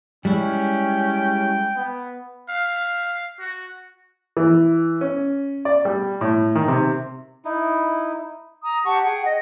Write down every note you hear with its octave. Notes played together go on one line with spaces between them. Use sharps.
G3 G#3 C#4 E4 G5
B3
F5
F#4
E3
C#4
D5
G3
A2
D#3
C3
D#4 E4
A#5 D#6
G4 F#5 A5 C#6
G#4 F#5 G5
D#5